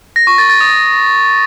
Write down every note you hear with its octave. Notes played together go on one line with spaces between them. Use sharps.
A#6
C#6
A6
A6
D#6